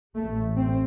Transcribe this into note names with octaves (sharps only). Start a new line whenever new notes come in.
A1 A2 A3
C4